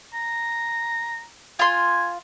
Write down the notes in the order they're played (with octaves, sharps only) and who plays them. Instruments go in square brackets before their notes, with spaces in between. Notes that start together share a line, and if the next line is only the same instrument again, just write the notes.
[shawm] A#5
[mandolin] F4 C6 [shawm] G#5